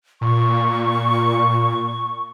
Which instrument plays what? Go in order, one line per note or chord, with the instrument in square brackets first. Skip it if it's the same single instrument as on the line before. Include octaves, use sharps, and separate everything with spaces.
[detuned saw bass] A#2 [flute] C#6